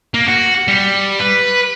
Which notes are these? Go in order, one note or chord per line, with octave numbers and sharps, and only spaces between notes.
A#3
F#4
G3
B4